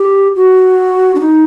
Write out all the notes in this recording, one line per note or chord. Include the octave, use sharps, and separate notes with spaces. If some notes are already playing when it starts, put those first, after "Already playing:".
Already playing: G4
F#4
D4
D#4